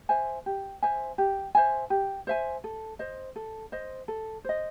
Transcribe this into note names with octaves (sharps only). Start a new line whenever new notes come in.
C5 E5 G#5
G4
C5 E5 G#5
G4
C5 E5 G#5
G4
C5 E5 G#5
A4
C5 D#5
A4
C5 D#5
A4
C5 D#5